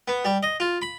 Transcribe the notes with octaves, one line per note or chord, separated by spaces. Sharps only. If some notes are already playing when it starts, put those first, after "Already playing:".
B3
G3
D#5
F4
B5